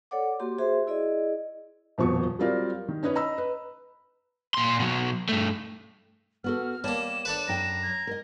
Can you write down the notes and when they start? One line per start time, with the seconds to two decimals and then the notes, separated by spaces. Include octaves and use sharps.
0.11 A4 C#5 D5 F#5 D6
0.40 A#3 F#4 G4 C6
0.58 F#4 G#4 C5 E5 C6
0.87 E4 G#4 D5 D#5
1.98 D#1 F2 B2 C#6
2.39 F#3 G3 C4 F4 A#4 D5
2.88 D#3
3.03 C#4 D#4 B4 C#5 D#5
3.15 D#5 A#5 B5 E6
3.38 B4
4.54 A#2 C6
4.80 B2 F#3
5.29 G2 A3
6.44 B3 F#4 A4 F6
6.84 G3 A#3 C#5 A5 E7
7.25 D4 A4 B4
7.48 F#2 G5 A#5
7.83 G#6
8.07 A#4 D#5